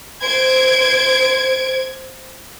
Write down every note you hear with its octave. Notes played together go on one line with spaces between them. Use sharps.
C5 G#6 D7